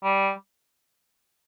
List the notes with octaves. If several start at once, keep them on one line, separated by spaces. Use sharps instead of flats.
G3